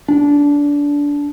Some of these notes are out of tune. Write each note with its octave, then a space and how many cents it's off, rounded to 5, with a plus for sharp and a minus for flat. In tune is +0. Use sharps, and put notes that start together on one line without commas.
D4 -20